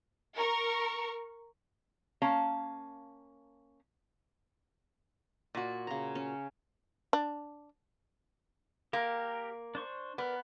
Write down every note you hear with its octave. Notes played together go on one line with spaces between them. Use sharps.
A#4 C#6
A#3 C#4 F5 A5 A#5
A#2 F#4
C#3 A#5
C#4
D4
A#3 G4 A#4
D4 C5 C#6
B3 A#4 B4 D5